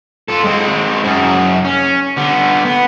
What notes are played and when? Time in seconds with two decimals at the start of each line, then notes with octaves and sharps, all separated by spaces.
0.28 F4 A4
0.44 G#3 C4
1.04 F#2 G#4
1.65 C#4
2.17 D3 B3
2.65 B3